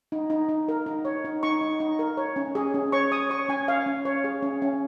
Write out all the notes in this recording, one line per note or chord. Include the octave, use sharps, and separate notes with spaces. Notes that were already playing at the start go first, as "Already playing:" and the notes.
D#4
D#4
D#4
A#4
D#4
C#5
D#4
D#4 C#6
D#4
D#4
A#4
C#5
C#4
G#4
C#4
C#5 C#6
C#5 D#6
C#5 C#6
C#4 G#5
C#5 F5
C#4
C#5
G#4
C#4
C#4